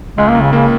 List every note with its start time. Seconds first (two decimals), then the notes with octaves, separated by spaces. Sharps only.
0.18 C#2 G#3
0.29 A#3
0.35 C#2
0.42 C#3
0.53 C#3 A#3